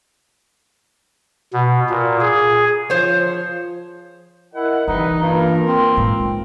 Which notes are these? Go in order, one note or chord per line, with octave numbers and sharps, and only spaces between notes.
B2
A#2
G#4
F3 C5 C#5
E4 A#4 D#5 F#5
G2 C3 E3 D#4 B4
G2 A#3 F4 A#4
C4
G#2